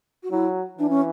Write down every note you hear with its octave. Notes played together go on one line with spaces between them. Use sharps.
F#4
F#3 E4
E3 D4
C#4